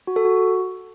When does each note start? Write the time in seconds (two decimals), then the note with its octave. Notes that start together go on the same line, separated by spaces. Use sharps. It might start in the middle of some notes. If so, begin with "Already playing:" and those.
0.07 F#4
0.16 A4
0.25 F#4